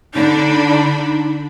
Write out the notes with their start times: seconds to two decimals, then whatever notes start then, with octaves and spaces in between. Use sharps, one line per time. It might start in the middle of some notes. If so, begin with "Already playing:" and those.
0.15 D3 D4 D#4 B5